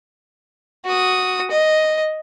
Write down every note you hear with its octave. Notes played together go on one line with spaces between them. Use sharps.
F#4 D#6
D#5